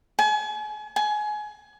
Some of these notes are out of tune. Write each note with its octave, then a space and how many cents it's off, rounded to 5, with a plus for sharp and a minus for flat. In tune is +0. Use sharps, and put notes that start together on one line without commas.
G#5 +35
G#5 +25